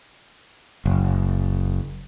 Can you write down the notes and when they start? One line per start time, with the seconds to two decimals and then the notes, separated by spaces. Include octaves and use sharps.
0.86 F#1